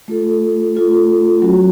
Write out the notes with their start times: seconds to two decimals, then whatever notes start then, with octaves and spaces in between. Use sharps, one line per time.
0.08 A3 F4 A4
0.75 A3 F4 A4
1.42 F#3 C#4 F#4